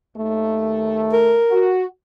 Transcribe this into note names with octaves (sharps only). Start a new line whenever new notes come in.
D#2 A3
A#4
F#4